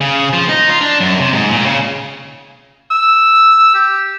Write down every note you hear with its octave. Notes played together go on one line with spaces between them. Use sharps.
C#3
F3
D#4
F4
D4
F#2
C3
G#2
A#2
C#3
E6
G4